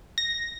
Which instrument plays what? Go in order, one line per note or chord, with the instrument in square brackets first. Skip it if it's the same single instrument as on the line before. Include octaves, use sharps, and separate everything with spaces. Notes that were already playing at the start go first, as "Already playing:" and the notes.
[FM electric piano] A#6